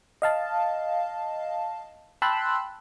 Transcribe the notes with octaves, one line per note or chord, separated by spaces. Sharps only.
D#5 F5 A5
G5 A5 B5 C6 E6 F#6